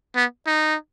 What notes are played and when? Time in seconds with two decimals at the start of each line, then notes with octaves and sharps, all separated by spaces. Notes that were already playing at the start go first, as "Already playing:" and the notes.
0.15 B3
0.47 D#4